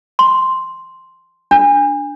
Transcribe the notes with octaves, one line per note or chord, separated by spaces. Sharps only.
C6
D4